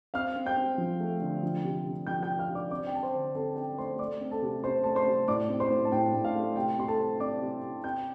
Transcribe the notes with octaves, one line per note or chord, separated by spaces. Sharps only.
C4 F5 F6
C4
G5 G6
C4
F3
A3
D3
F3
C3
C3
F3 G5 G6
G5 G6
C3
F5 F6
C3
D5 D6
C4 D5 D6
G5
C4 A5
C5 C6
D3
C4 A4 A5
C4 G5
A3 C5 C6
A3 D5 D6
C4
A4 A5
C3
C3 C5 C6
A3 A5
C5 C6
C3
A2 D5 D6
C4
C5 C6
A2
A5
A2 G5
A2
F5
A3
C3 G5
C3 C6
A4 A5
C4
C4 D5 D6
C3
C3
C4 G5 G6